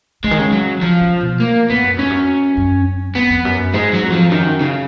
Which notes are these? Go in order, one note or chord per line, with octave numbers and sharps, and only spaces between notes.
C#3 G#3
D#3
C#3
F#3
C#3 F3
C#3
B2
A#3
G#2 B3
F#2
F2 C#4
F#2
F#2
F2 B3
F2
F#2
G#2 G#3
F#3
F2
F3
F#2 D#3
C#3